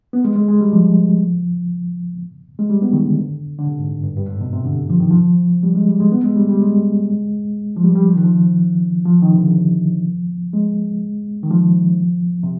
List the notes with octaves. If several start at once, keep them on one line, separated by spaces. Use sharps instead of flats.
B3
G#3
G#3
G#3
G3
F3
G#3
G3
B3
D#3
D3
D3
C3
G#2
G2
G2
G2
G#2
B2
C3
D3
F3
D#3
F3
G3
G#3
G3
G#3
B3
G#3
G3
G3
G#3
F3
G3
G3
F3
D#3
F3
F3
D#3
C3
D3
F3
G#3
D#3
F3
C3